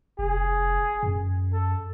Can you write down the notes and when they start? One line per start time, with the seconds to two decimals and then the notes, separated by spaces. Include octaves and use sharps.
0.19 F1 G#4
1.03 F#2
1.53 A4